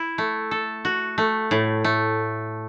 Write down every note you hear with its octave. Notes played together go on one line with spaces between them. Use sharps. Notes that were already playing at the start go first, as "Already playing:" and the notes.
Already playing: E4
A3
A4
F#4
A3
A2
A3